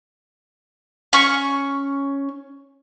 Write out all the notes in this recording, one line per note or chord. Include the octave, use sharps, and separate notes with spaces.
C#4 C#6